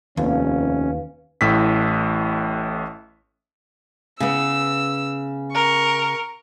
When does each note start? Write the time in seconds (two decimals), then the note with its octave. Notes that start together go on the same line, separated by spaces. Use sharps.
0.17 F1 D#2 C#4 B4 F5
1.41 A1 A2 E6 B6
4.20 C#3 B3 E6
5.55 A#4 C#6